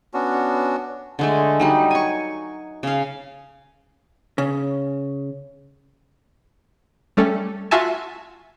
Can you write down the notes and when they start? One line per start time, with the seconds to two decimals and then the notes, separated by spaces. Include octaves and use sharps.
0.14 B3 C#4 D4 F#4
1.19 D3 G#3 A3
1.60 F#3 G3 D#4
1.91 G#5 C#6
2.83 C#3 F5
4.38 C#3
7.17 G3 A3 C#4 A4
7.71 F4 F#4 E5 G#5 A5